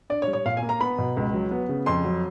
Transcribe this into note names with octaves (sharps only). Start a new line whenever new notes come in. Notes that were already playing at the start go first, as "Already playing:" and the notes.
D4 D5
C#5
G3
C#5
A#2 F5
G#5
A#3
A#5
B3 B5
B2
C#2
F#3
B3
C#3
F2 C6
F#3